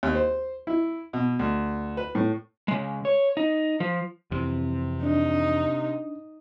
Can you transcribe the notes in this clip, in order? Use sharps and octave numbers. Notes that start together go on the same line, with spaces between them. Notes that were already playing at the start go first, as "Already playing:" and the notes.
D#2
C5
E4
B2
D2
B4
A2
C#3 G#3
C#5
D#4
F3
F2 C3 E3
D4 D#4